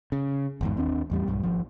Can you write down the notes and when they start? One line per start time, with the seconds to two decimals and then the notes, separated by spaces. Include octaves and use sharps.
0.12 C#3
0.61 G1 E2 G#2
0.77 D#2 C4 D4
1.10 A1 E2 G3
1.28 B1 G2
1.43 G#1 F3